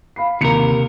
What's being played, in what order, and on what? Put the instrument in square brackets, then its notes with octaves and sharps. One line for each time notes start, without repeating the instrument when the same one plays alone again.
[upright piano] F5 B5 C7
[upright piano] D#2 C#7 F7 [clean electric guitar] C3 A#4